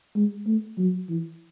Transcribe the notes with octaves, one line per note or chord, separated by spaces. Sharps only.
G#3
A3
F#3
E3